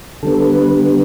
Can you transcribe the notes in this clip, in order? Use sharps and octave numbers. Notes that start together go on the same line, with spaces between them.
D3 G3 B3 A4
B4